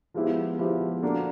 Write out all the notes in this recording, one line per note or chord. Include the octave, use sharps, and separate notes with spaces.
F3 G#3 B3 E4 G4
F3 G#3 B3 E4 G4
A#3 D4 F#4 A4